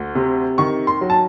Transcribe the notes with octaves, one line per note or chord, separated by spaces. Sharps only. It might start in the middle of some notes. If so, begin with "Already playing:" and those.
Already playing: D2
C3
D#3 C#6
C6
F#3
A5